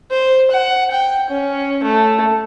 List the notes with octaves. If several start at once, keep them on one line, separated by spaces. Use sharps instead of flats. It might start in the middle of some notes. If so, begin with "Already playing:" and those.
C5
F#5
G5
C#4
A3